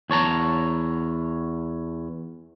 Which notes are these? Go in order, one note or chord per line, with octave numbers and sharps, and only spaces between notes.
E2 C#5 A5 A#5